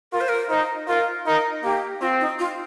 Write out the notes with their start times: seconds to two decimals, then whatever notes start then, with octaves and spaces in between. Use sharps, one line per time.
0.13 F4 A#4
0.21 C5
0.29 A#4
0.49 D#4 C5
0.88 F4 A#4
1.26 D#4 A#4
1.63 A#3 G4
2.01 C4 F4
2.20 D#4
2.39 F4